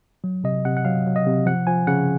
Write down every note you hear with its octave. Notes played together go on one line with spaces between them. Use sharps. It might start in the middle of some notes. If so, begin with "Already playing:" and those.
F#3
C3 D#5
C3 F#5
F#5
F#3 F5
F#3
D#5
C3
F3 F#5
F3 G#5
C#3 F#5